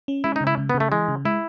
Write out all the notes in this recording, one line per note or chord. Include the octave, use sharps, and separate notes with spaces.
C#4
G#3 E4
D#4
C#3
E4
C#3
B3
C#3
A3
E3 G#3
C#3
G#3 E4